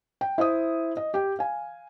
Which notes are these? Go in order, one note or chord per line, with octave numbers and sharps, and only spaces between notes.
G5
E4 C5 E5 D#6
D#5
G4 G5
F5 G#5